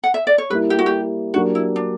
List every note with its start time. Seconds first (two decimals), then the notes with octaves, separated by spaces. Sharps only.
0.04 F#5
0.14 E5
0.27 D5
0.38 C#5
0.50 G3 A#3 E4 B4
0.70 G4
0.79 F#4
0.86 G4
1.34 F#3 A#3 D4 F#4 G4
1.55 E4
1.76 D4